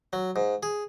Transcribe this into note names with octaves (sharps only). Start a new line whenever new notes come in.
F#3
G#2
G#4